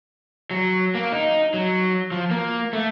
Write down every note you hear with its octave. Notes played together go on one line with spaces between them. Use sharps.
F#3
A#3
D#4
F#3
F3
A#3
A3